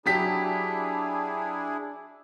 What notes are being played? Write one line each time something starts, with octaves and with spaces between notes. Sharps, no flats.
F#3 D4 E4 G4 G#4 B6